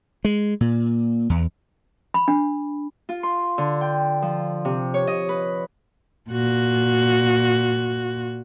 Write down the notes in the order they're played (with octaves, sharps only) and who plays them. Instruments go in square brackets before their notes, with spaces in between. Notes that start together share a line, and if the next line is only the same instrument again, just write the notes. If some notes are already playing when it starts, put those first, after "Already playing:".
[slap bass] G#3
A#2
E2
[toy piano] B5
D4
[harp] F4
C6
D3
G5
F3
C3
C#5
D#5
B4
[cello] A#2 F#4